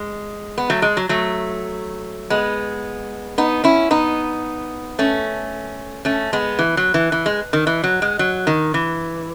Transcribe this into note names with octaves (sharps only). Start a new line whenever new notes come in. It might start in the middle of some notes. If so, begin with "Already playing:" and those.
Already playing: G#3
B3
F#3 A3
G#3
F#3
F#3 A3
G#3 B3
B3 D#4
C#4 E4
B3 D#4
A3 C#4
A3 C#4
G#3 B3
E3
F#3
E3
E3
G#3
D#3
E3
F#3
G#3
F#3
D#3
E3